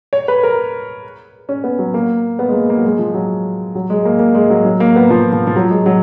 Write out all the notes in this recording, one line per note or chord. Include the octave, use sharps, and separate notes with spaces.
C#5
B4
A#4
C#4
B3
F#3
A#3
B3
G#3
A#3
A#3
F#3
G#3
F3
F#3
F#3
G#3
A#3
A#3
G#3
F#3
F#3
A#3
B3
F3
F3
F3
F#3
G#3
F#3